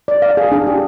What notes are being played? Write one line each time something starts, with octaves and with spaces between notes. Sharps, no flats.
D5
F5
G#4
D4
G4